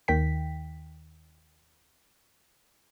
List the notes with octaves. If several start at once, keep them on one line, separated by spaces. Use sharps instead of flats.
D#2 D#3 G5 B6